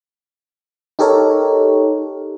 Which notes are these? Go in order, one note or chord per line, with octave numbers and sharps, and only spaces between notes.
D#4 G4 A4 A#4 C#5